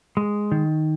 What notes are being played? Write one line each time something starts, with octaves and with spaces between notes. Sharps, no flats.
G#3
D#3